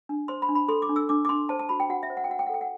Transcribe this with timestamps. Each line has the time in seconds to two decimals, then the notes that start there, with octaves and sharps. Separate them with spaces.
0.09 D4
0.28 C5 C6
0.42 B5
0.49 D4
0.55 B5
0.69 A4 C6
0.82 D6
0.89 D4
0.96 E6
1.09 D4 D6
1.25 D6
1.29 D4 C6
1.49 C5 A5
1.59 A5
1.69 F#4 B5
1.80 G5
1.90 F#4 F#5
2.03 E5
2.10 C5
2.17 F#5
2.24 G5
2.29 F#4 F#5
2.39 G5
2.47 F#5
2.49 A4 G5
2.61 F#5